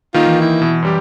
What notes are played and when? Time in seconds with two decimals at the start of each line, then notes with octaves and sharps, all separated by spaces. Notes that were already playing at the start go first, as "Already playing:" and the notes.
0.14 D#3 A#3 D#4 F4
0.27 E3
0.41 E4
0.62 B2 E3
0.82 F#2 G3 G4